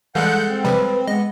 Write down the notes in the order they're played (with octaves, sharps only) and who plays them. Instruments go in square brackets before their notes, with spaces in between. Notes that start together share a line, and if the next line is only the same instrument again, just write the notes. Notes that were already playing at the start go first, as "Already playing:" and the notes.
[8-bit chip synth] E3 G3 [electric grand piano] G#3 A4 F5 [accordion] F#5 F#6 G6
[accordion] C4
[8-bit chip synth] C3 F3 G3 [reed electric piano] B4
[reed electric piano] G#3 [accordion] B3 [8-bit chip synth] D#5